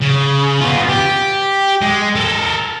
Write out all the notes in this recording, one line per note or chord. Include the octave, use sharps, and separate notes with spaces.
C#3
B3 F4
G4
G#3
A4 A#4